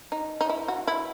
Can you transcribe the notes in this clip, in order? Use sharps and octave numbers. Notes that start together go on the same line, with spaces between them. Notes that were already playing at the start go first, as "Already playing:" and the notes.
D#4
D#4
E4
F#4
E4